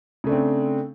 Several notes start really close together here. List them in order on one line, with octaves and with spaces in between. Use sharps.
C#3 A3 D4 C4